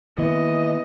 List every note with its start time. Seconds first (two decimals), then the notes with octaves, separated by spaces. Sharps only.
0.18 D#3 E3 A#3 B3 D#5